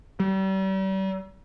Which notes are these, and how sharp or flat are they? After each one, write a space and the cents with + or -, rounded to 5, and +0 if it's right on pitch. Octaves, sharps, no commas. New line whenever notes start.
G3 -35